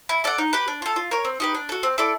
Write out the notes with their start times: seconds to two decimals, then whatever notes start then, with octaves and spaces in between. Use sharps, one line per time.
0.09 E4
0.24 A4 D5 F#5
0.38 D#4
0.53 G4 B4
0.68 D4
0.82 F4 A4
0.96 F4
1.11 A#4 C#5
1.25 C4
1.40 D#4 G4 B4
1.55 D4
1.69 F#4 A4
1.83 C4
1.98 E4 A4 D5